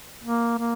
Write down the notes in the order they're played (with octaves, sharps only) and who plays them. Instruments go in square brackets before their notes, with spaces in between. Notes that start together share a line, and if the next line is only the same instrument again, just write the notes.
[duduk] A#3
A#3